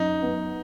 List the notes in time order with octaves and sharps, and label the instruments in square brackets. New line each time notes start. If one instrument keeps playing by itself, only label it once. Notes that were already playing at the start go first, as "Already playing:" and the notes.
Already playing: [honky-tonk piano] F#2 [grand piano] D#4
[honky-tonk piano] B3